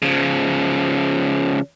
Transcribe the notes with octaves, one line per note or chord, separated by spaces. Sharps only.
C#3 F3